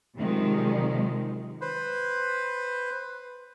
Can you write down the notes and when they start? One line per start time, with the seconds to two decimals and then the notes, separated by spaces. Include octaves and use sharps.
0.18 C3 D#3 F3 F#3 G#3
1.61 B4 C5